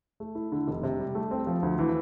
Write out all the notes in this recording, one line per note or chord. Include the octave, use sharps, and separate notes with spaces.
A3
E4
D3
F1
C3
G3
A3
C4
F3
D2
E3